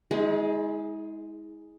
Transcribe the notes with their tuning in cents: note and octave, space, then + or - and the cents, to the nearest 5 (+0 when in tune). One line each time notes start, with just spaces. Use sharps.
G#3 +0 E4 -45 G#4 +30